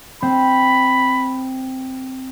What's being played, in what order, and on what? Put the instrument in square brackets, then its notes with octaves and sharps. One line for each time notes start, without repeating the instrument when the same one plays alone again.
[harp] C4 [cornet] B5